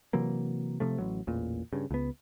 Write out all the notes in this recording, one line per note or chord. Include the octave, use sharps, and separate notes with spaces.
C3 E3 F#3 A#3
C3 F3 A3
A1 F#3
A1 E2 A#2
G2 C#3
C#2 B3